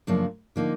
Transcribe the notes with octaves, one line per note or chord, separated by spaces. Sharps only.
F#2 C#3 F3 A#3 D4
D3 F3 A#3 D#4